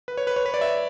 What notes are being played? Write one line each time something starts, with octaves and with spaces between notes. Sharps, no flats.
B4
C#5
B4
C#5
B4
D5
E5